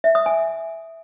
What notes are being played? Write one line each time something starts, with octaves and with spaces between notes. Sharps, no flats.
E5
D#6
G#5